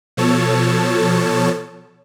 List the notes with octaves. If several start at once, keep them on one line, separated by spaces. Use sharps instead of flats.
B2 F3 A4 C#5 A5